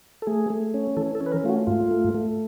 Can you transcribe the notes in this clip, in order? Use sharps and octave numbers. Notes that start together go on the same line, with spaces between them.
A4
A3 G#4
A3
C#4
E3 A4
A4
C#4
B4
A#4
A3 F4
F#4
G#2 F4
A3
A3